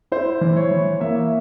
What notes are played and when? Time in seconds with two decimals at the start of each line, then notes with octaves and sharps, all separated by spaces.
0.12 E4 C5
0.41 E3
0.57 C#5
0.71 E3
1.00 A#3 E5